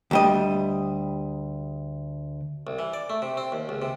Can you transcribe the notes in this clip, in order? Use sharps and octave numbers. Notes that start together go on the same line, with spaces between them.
D2 G3 D#5
C2
E3
D5
A3
C3
C4
D#2
C#2
C3